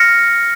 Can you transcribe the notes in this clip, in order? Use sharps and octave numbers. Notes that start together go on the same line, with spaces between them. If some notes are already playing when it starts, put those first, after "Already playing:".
Already playing: F6 A#6 C#7